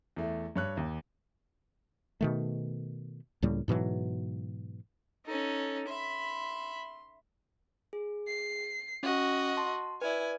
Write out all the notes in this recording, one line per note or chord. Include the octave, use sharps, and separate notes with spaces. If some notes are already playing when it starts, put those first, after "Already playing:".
E2 A3
G2 C#5 F#6
D#2
B2 D#3 A3
C#2 A2 G3 A#3
G#2 B2 E3 F#3
C#4 D#4 A4
E5 B5 C6
G#4
C7
C#4 F#4 D#5
A5 C6
E4 B4 D5 G#5